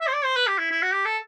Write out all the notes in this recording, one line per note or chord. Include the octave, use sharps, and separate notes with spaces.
E5
C5
D5
C5
B4
G4
E4
E4
F#4
G4
A4